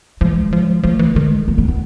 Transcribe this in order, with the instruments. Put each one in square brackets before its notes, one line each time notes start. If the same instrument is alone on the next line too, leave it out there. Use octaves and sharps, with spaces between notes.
[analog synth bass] F3 [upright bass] G#3
[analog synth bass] E3
F3
F3
F#3
F3
[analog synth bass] F3 [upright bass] A3
[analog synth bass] E3
[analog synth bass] D#3 [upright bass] G#3
[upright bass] A#3
B3
B3